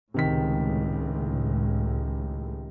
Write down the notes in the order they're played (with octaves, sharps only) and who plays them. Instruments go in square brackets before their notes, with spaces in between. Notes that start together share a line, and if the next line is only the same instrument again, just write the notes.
[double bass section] C#2 A2 [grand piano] C3 D#3 B6